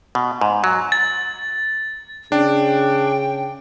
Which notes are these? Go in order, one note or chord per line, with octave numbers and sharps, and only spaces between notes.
B2
G#2
F#3
A6
C#3 D4 G5